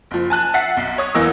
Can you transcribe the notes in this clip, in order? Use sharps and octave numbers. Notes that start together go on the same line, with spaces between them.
F#1 F3
G#5 A5 F#6
E5 F#5 A6 C7
B1
C#5 D#6
E2 E3 A#3 D#5 E6